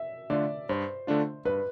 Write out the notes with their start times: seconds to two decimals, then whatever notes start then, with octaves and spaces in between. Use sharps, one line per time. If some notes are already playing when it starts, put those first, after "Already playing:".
Already playing: E5
0.30 D3 A3 D4 F4 D5
0.69 G2 C5
1.07 D3 A3 D4 F4
1.45 G2 B4